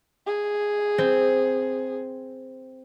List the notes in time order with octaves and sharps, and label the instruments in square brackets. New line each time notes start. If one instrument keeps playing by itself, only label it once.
[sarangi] G#4
[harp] C4